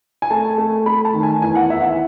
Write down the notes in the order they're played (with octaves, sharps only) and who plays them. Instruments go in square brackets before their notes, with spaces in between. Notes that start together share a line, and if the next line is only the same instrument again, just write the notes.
[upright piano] G#5
A3 A5
A3
A3 B5
A5
D#3
G#5
E2 G#5
F#5
E2 E5
F#5
E5